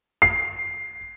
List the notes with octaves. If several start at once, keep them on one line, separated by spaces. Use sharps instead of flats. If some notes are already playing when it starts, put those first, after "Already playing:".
C7